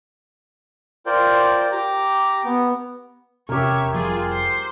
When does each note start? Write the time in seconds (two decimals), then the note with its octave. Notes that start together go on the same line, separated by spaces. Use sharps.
1.06 F4 A#4 C5 D5 G5
1.72 G4 A#5 D6
2.44 B3
3.49 E1 C3 C#4 G4 A#4 C#5 E5
3.94 F1 F3 G3 F4 G#4
4.29 C5 C7